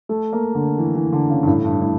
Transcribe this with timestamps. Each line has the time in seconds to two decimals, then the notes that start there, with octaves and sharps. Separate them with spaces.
0.09 A3
0.33 A#3
0.55 D3
0.78 E3
0.95 E3
1.13 D3
1.30 C#3
1.43 G2
1.47 A2
1.65 G2
1.82 A2